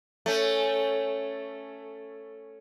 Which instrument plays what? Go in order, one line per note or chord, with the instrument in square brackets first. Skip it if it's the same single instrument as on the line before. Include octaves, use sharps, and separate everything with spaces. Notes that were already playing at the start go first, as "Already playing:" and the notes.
[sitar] A3 C#4